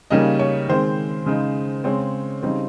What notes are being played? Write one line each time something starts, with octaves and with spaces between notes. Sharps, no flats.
C#3 G3 A#3 C#4 D#4 D#5
C#5
D#3 G#3 C4 C5
C#3 G#3 D#4
C#3 G#3 C4 C#5
C#3 G3 C4 D#4